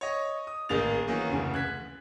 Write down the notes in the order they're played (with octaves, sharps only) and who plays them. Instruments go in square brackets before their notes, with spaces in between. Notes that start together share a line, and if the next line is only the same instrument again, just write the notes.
[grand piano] C#5 D#5
D#6
A1 D#3 G#3 A#3 A6 F7
D#3 E3 A#3 C#4 F#4
F1 D2 C#3 E3
F#6 G#6 B6